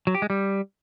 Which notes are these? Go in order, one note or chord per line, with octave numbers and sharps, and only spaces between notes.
F#3
G4
G#3
G3